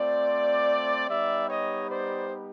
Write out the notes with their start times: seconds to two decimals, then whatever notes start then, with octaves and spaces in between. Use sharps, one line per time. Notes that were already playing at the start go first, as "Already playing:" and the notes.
Already playing: A3 C4 F4 C5 D5
1.09 G3 B3 D#4 G4 D5 E5
1.49 C#5 D#5
1.89 C5 D5